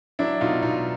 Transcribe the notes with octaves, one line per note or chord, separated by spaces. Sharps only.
F#3 D4 E4
B2 D#4 F4
B2 D#4 F4